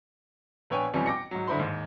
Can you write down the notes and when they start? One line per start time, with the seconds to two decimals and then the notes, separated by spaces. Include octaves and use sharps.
0.70 A#1 B3 B4 C#5 G5 G#5
0.94 F2 B2 E3 F3 G3 C#4
1.06 G5 D6 A#6 C#7
1.31 G#2 F#3
1.47 G2 D3 E4 C5 B5 C6
1.59 D#2 G#2